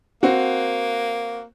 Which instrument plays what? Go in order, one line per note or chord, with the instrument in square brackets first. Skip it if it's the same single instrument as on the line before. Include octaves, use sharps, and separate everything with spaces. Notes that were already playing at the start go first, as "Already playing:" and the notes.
[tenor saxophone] A#3 [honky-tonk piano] C4 F#4